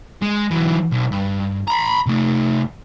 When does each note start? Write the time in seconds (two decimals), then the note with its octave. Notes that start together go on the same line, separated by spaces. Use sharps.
0.22 G#3
0.51 E3 F#3
0.92 B1
1.12 G2
1.68 A#5 B5
2.07 C3 A3